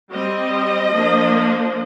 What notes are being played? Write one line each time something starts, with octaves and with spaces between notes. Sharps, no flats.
G3 C4 D#5
F3 A#3 D4